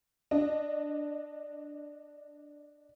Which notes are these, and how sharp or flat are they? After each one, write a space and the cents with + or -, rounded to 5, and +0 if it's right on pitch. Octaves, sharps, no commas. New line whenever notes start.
D4 +0 D#5 -20